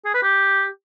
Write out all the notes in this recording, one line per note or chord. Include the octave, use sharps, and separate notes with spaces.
G#4
B4
G4